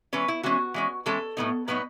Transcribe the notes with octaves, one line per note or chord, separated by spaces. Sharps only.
E3 G#3 C#4 B4
E4
E3 G#3 C#4 F#4
E3 G#3 C#4
E3 G#3 C#4 A4
A2 F#3 B3 D#4
A2 F#3 B3 D#4 B4